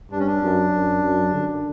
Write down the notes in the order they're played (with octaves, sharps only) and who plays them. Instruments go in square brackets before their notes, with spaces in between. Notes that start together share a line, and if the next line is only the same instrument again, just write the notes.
[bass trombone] G2 [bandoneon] D4
[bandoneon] C#4
D4
[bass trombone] F#2
F#2
F#2
D3